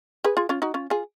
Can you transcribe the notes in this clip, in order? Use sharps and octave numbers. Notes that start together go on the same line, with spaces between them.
G#4 B4
F4 G#4
C#4 F4
D#4 F#4
C#4 F4
F4 G#4